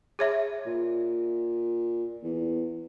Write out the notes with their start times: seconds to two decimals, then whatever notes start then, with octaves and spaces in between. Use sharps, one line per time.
0.19 G#4 C#5 E5
0.66 A#2
2.23 E2